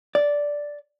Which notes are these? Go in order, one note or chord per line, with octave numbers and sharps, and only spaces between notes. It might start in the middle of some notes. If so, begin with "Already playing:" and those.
D5